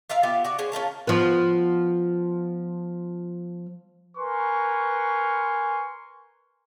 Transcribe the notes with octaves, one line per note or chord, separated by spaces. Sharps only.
F4 A#4 E5 F5
B3 F4 G4 E5
F#4 D5
C#4 G#4 C5
C#4 F4 A#4 A5
F3 B3
A#4 B4 G#5 C6 C#6